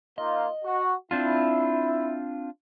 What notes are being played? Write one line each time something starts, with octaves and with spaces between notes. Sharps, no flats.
A#3 D#4 F4 D#5
F#4
C4 D4 E4 F4